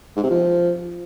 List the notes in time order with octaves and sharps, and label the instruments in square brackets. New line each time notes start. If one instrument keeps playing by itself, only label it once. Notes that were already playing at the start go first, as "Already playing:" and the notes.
[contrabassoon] G#2
C3
F3